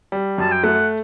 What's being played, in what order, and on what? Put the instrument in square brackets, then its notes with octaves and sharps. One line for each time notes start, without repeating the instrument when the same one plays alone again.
[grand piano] G3
[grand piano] F#2 [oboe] A5
[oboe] G5
[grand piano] A3 [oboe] F#5